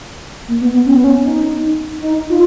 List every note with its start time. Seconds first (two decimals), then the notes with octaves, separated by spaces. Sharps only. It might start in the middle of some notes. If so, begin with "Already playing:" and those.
0.48 A#3
0.61 B3
0.74 B3
0.86 C#4
0.96 B3
1.04 C#4
1.25 D#4
2.01 D#4
2.30 F4